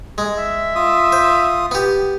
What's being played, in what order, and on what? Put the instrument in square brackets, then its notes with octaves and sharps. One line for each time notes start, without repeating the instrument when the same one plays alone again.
[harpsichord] G#3
[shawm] E5
[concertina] F4 D#6
[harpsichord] C5
B3 G4